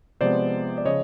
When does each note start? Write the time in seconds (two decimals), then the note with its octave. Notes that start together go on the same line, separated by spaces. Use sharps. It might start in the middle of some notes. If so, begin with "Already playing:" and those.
0.21 C3 F3 G#3 B3 C5 D5
0.78 D5
0.85 C#3 F3 C#5 D#5